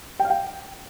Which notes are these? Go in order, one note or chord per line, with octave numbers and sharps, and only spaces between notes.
G5
F5
G5